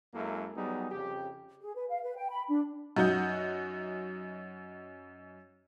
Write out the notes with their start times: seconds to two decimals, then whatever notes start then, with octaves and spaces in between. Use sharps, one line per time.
0.14 F#2 G#3 A#3 E4 A4
0.56 F#3 G3 B3 D#4 G#4
0.91 F2 C#3 G4
1.61 G#4
1.75 B4
1.90 F5
2.03 B4
2.16 G5
2.30 B5
2.49 D4
2.97 F#2 D#4 F#4 F#5 G6